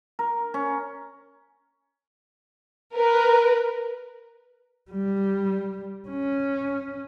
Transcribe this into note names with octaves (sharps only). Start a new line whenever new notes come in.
A#4
C#4
A#4 B4
G3
C#4